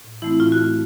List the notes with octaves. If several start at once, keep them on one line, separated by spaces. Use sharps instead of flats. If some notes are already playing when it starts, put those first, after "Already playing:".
A2
E3 A3 C4 E4
A2 F4
F#4
E3 A3 C4